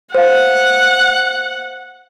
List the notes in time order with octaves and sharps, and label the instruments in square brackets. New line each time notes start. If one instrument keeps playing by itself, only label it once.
[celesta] C5 F5 [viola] F#5